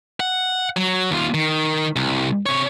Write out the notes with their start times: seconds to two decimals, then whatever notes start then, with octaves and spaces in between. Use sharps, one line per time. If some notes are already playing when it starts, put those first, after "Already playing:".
0.20 F#5
0.76 F#3
1.11 D#2 F4
1.34 D#3
1.96 C2
2.46 C3 C#5